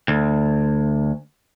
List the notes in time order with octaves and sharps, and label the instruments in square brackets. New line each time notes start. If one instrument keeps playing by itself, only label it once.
[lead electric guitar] D2